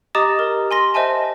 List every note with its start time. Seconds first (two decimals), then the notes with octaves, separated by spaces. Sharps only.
0.15 G4 D#5 A#5 D6 D#6 A6
0.39 A#4
0.71 G#5 C6 A#6
0.94 C5 D#5 E5 G#5 A5